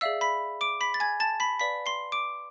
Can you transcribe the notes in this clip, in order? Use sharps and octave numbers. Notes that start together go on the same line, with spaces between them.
G#4 D5 E5 F5 E6
B5 B6
D6 D7
B5 B6
A6
G#5 G#6
A5 A6
B5 B6
B4 D5 F5 B5 B6
C6 C7
D6 D7